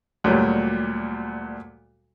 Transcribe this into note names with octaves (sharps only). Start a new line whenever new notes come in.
D2 A#2 F#3 G3